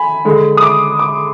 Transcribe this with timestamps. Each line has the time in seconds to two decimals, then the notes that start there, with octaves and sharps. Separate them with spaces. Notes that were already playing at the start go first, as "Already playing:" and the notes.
Already playing: G#5 B5
0.25 D3 G#3
0.57 D#6
0.63 D6
0.99 D6